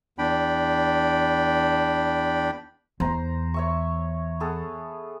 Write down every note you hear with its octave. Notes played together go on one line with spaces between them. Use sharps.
E2 D4 G5 B5
E2 C5 A#5 C6
C#5 E5 C#6
B3 G#4 A4